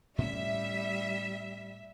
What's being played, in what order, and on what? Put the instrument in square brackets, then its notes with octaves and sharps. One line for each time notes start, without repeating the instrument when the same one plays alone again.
[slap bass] A2 C#4 [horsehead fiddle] G3 [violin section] E5